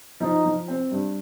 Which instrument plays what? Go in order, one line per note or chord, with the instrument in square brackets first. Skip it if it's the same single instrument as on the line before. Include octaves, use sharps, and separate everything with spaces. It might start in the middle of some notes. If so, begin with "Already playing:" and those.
[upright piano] F3 [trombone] D#4
[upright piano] F3
C4
G2